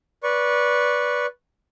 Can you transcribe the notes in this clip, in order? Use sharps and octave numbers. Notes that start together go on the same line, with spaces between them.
B4 D5 C#6